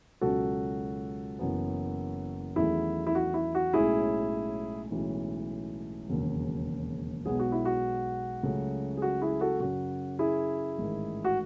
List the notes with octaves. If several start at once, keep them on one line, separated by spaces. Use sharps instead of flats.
C#2 B2 F#3 C#4 F#4 A4
F#1 F#2 E3 B3
E2 D#3 F#3 A3 C#4 E4 G#4
E4
F#4
E4
F#4
B1 A2 G#3 C#4 E4 G#4
B1 A2 E3 G#3 C#4
E1 D#2 C#3 F#3
B1 B2 G#3 B3 G#4
F#4
E4
F#4
C#2 C#3 F#3 A3 C#4
G#4
F#4
E4 G#4
F#4 A4
F#2 C#3 F#3 C#4 F#4
E4 G#4
A1 G#2 D#3
F#4